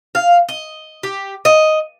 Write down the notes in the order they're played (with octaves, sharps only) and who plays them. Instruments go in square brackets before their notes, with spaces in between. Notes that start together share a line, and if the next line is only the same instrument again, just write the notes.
[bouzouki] F5
D#5
G4
D#5